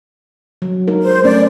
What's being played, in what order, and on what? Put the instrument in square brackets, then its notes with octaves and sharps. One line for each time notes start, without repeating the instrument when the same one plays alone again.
[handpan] F#3
G#3 D#4 A#4
[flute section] C5
[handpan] A3 C#4 [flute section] D5